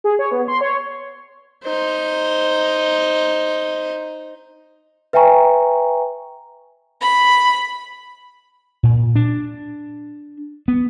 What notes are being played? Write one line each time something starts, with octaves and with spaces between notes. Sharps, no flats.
G#4
C#5
B3
C6
C#5
D#4 C5
B4 E5 G5 G#5 A#5 C#6
B5
A#2
D4
B3